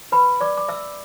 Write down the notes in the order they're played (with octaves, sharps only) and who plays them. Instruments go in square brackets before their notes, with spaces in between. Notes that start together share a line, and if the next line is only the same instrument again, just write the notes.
[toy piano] B4 B5
D5 D6
D6
E5 E6